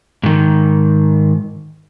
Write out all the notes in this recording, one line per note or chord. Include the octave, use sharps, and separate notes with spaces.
G#2 D#3